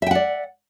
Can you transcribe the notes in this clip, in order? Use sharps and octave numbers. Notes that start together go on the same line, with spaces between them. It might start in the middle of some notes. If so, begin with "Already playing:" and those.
D5 E5 F#5 G5